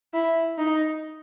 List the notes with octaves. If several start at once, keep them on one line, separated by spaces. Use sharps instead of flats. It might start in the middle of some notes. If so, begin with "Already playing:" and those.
E4
D#4